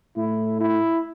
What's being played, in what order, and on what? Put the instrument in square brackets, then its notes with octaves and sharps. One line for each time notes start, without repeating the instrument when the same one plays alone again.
[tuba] A2 [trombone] E4
[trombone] E4